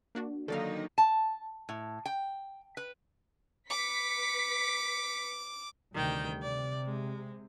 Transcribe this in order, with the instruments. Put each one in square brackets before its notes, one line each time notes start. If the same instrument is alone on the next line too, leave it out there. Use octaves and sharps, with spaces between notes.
[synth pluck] A#3 D4 F#4
[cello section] D3 D#4 [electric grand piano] D#3 F#3 A#3 [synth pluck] A4 D5 F5
[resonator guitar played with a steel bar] A5
A2
G5
B4
[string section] B4 B6 C#7 [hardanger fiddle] D6
[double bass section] D2 C3 G3 [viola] D#3 G5
[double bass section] C3 [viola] D5
[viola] G#3